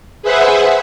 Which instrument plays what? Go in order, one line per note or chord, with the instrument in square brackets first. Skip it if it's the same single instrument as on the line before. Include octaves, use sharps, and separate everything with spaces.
[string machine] G#4 B4 C5 E5 F#5